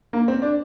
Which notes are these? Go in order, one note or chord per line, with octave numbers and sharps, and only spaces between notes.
A#3
C4
D4